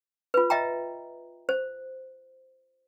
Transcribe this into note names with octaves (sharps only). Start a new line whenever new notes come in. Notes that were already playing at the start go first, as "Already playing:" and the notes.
F4 B4
D#5 E5 G5 A#5
C5